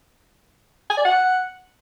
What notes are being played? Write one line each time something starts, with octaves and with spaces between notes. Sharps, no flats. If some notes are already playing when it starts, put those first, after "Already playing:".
G#5
D5
F#5